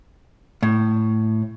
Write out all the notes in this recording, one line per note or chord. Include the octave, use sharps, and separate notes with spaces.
A2